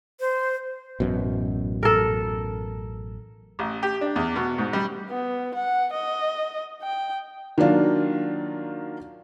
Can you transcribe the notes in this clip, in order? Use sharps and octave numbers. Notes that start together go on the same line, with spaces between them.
C5
A1 F#2 B2
A4 A#4
A1
G4
D4
E2
B2
G#2
G3
B3
F#5
D#5
G5
D#3 F#3 A#3 D4 F4